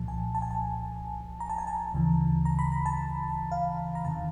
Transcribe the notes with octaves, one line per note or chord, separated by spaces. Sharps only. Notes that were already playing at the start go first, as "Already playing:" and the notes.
Already playing: C2 A#2 F3 A5
G#5
A5
G#5
A5
A#5
A5
G#5
A5
D2 C#3 E3
A#5
B5
A#5
A5
F5
A#5
E2 C3 D#3 A5